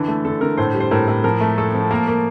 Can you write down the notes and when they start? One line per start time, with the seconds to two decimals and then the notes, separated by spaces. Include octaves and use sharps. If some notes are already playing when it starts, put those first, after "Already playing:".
Already playing: D3 E3
0.08 A3
0.25 D3 A4
0.41 D3 A#4
0.57 A2 A4 C5
0.74 G3
0.80 C5
0.91 A2 A#4
1.08 A2
1.24 F3 A#4
1.41 A3
1.57 A3 A4
1.74 F3
1.91 A#3 A#4
2.07 A#3